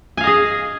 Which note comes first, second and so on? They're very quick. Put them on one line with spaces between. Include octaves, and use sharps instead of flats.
G#5 F5 D#5 G#4